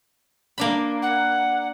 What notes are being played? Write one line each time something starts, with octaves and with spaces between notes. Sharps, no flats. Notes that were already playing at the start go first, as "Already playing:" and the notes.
A#3 D4 B5
F#5